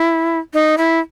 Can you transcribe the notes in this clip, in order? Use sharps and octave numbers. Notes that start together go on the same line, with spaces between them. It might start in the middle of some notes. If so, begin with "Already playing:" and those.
Already playing: E4
D#4
E4